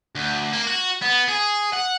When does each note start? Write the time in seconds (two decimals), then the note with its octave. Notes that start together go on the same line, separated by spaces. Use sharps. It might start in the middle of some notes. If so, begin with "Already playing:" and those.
0.15 D2
0.53 A#3
0.67 F#4
1.02 B3
1.29 G#4
1.73 F#5